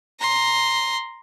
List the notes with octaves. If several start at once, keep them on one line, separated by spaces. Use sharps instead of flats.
A#5 C6